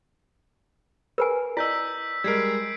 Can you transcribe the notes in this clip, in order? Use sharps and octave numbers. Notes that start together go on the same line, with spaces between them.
A#4 B4 G#5
E4 D5 D#5 E6 G6 B6
G3 G#3 A#4 G#6 C7 D7